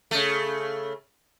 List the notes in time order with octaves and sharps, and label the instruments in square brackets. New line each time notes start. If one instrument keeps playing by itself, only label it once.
[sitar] C#3 A3